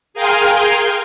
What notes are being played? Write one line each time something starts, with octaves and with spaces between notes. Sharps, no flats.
G#4 A#4 F5 G5 G#5 C6